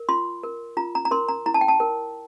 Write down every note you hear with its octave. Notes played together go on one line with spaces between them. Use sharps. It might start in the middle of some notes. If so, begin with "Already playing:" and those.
Already playing: A#4
F4 C6
A#4
F4 A#5
A#5
A#5
A#4 C6
A#5
E4 A#5
A5
G5
A5
A#4